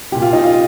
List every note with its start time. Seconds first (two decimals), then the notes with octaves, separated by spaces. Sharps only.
0.12 C2 A#2 G4
0.22 F4
0.33 D#4
0.44 F4